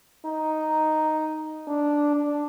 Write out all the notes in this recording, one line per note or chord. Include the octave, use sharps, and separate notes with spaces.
D#4
D4
D4